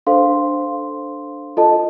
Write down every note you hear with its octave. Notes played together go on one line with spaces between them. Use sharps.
D4 A4 C5 F5 C6
F4 A4 D#5 A5